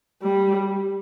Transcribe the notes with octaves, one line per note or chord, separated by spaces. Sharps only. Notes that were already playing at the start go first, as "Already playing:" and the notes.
G3